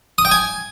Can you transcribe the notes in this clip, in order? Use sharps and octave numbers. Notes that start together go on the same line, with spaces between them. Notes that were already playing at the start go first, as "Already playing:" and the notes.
D#6
G5
G#5